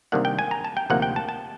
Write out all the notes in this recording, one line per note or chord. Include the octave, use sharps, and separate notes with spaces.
C3 D#3 G3 A#3 D4 F#5
G5
G#5
A#5
A5
G5
D2 C3 F3 A#3 D#4 F#5
G5
A5
A5